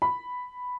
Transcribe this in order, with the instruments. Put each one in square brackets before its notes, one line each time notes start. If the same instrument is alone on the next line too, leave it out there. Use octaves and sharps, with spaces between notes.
[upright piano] B5